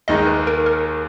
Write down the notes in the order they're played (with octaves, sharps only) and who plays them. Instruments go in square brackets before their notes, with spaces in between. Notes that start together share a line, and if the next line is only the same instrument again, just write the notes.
[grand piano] D#2 D#3 G#3 D#4 [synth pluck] D#5
[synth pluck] B4
A#4
A#4